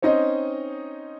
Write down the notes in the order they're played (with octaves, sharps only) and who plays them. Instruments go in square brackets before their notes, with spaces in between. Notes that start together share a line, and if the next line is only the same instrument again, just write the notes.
[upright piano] C4 C#4 D#4 C5 D#5